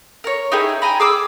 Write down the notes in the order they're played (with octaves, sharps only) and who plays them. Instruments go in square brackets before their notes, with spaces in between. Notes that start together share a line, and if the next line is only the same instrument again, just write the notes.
[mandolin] A#4 C#5
D#4 E4 G4 G#4
G5 G#5 A#5 B5
G#4 D6 E6